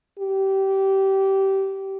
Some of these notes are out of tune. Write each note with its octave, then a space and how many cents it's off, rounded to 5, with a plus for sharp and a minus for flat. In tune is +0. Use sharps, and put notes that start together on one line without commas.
G4 -20